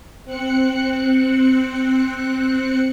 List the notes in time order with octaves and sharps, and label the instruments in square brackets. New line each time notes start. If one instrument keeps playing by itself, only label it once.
[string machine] C4 F#6 C#7